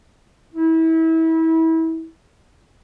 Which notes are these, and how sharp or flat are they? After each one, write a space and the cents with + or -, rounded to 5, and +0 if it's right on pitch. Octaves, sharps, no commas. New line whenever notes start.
E4 -30